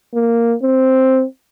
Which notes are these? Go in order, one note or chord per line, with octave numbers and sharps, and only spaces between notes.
A#3
C4